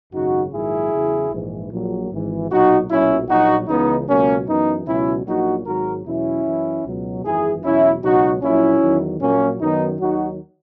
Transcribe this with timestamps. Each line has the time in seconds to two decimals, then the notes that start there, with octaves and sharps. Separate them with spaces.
0.12 G#1 F#2 C#3 D#4 F#4
0.53 A#1 G#2 D#3 F#3 E4 G#4
0.92 E2 C#3 F#3
1.32 A#1 G#2 E3
1.71 A#1 A#2 F#3
2.11 G#1 G#2 E3
2.49 B1 A#2 F#3 D#4 F#4
2.89 B1 A#2 F#3 C#4 E4
3.28 A#1 A#2 F#3 D#4 F#4
3.68 C#2 C#3 E3 B3 D#4
4.08 C#2 B2 F#3 A#3 C#4
4.47 F#2 E3 B3 D#4
4.87 C#2 B2 F#3 C#4 E4
5.26 A#1 A#2 F#3 D#4 F#4
5.65 G#1 G#2 F#3 F#4 A#4
6.05 E2 B2 F#3 C#4 E4
6.45 F#2 E3
6.85 C#2 B2 F#3
7.23 G#1 F#2 E3 E4 G#4
7.63 E2 B2 F#3 C#4 E4
8.03 C#2 B2 F#3 D#4 F#4
8.42 A#1 A#2 F#3 C#4 E4
8.81 E2 D#3 F#3
9.21 A#1 A#2 F#3 A#3 C#4
9.60 F#2 D#3 F#3 B3 D#4
10.00 D#2 D#3 F#3 D#4 F#4